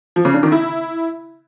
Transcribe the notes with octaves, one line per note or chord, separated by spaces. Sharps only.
F3
C#3
D4
D#3
E4